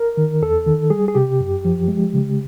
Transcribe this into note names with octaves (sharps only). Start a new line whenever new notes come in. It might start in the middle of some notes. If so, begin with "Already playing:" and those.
Already playing: A#4
D#3
E2 A4
D#3
G3 G#4
G#4
C3 G4
F#2
F3
G#3
C#3